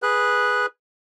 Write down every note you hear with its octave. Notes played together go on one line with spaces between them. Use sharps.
G#4 B4 F#6